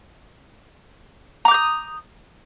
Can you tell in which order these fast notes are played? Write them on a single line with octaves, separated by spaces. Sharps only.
A#5 D6 G6 D#6